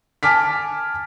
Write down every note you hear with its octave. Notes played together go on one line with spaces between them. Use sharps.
G#5 A5 D6 F6 B6